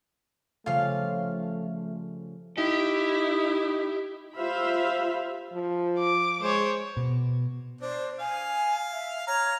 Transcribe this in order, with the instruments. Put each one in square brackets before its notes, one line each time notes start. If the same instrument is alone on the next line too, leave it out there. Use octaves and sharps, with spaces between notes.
[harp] C#3 F3 G3 [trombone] A3 [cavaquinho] F4 F5
[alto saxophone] D#4 [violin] E4 [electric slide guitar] G4
[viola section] F4 G4 C5 E5 F5 B5
[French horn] F3
[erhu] D6
[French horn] G#3 [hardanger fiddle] C5 C#5
[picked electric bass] B2
[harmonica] D4 [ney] C5
[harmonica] F5 [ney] G#5
[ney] E5
[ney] C#5 [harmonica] A#5 F6